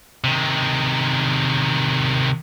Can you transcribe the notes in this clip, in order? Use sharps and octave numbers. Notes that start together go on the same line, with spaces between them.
C3 D#3